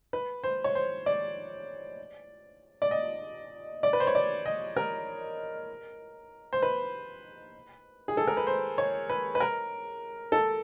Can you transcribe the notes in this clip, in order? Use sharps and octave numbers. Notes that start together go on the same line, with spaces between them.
B4
C5
C#5
C5
D5
D5
D#5
D5
B4
C5
C#5
D5
D#5
A#4
C5
B4
G#4
A4
A#4
B4
C5
C#5
B4
B4
A#4
A4